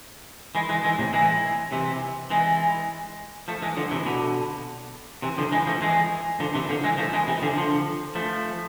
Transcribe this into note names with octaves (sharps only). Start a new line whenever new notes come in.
E3 G#3
E3 G#3
E3 G#3
A2 C3
E3 G#3
C3 E3
E3 G#3
F3 A3
E3 G#3
D3 F3
C3 E3
B2 D3
C3 E3
D3 F3
E3 G#3
F3 A3
E3 G#3
D3 F3
C3 E3
D3 F3
E3 G#3
F3 A3
E3 G#3
C3 E3
D3 F3
D3 F3
F3 A3